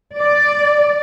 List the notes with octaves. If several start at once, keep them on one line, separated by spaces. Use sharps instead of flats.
D5